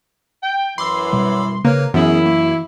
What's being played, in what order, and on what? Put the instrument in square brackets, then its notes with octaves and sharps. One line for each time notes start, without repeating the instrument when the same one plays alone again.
[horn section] G5
[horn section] F#2 E3 [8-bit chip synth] B5 D6 E6 [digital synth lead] C6
[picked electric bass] B2 G3
[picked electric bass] C#3 [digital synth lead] A#3 [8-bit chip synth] B4 C#5 F6
[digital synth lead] F#2 [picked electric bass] E3 [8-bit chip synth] B3 C#4 G#4 [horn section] E4
[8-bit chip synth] A#3